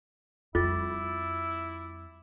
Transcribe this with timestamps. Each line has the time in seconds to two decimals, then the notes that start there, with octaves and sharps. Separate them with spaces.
0.55 F2 G3 E4 F4 G5 D6 A6